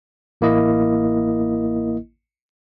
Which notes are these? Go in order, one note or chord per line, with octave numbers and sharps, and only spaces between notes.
A1 A#3 E4 D#5